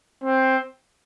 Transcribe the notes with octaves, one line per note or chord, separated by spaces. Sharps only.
C4